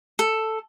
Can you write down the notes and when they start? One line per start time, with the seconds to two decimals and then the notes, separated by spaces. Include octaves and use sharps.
0.19 A4